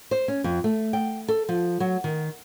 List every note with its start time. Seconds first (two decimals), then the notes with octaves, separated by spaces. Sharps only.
0.11 C5
0.28 C#4
0.44 F2
0.64 A3
0.93 G5
1.28 A4
1.49 F3
1.80 F#3
2.04 D#3